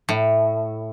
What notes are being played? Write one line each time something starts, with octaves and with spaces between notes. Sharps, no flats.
A2